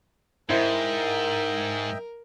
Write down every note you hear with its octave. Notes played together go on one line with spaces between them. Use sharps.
G#2 E4 A#4 C5 D#5 E5 G5